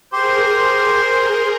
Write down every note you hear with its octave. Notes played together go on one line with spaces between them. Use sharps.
G4 G#4 A#4 C5 C6